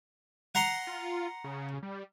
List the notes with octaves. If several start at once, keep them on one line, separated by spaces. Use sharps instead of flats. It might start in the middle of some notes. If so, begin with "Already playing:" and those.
F#5 A#5 C6
F4
C#3
G3